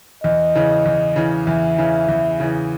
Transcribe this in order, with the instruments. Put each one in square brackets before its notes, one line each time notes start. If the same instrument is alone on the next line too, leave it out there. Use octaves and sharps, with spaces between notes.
[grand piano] E2 [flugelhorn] D#5
[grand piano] C#3 E3
E2
C#3 E3
[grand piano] E2 [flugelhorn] E5
[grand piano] C#3 E3
E2
C#3 E3